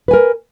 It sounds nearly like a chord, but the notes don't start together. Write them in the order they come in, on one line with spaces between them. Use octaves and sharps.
B4 G#5 A#4